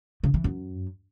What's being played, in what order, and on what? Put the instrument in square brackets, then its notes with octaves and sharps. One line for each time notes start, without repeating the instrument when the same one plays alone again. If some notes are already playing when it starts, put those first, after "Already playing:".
[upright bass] C#3
E3
F#2